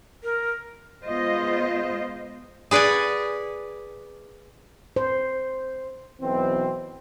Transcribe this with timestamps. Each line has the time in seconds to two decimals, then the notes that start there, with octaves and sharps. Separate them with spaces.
0.24 A#4
1.06 G#3 B3 F4 C5 D#5
2.71 G#4 B4 D5 F#5 G#5
4.96 C5
6.22 B1 B2 E3 C4